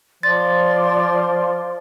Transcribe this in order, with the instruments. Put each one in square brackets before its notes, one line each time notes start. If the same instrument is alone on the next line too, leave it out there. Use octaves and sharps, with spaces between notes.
[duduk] F3 [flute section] D5 C6 [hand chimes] A6